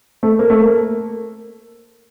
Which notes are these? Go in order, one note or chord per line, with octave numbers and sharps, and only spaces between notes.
A3
A#3
A3
A#3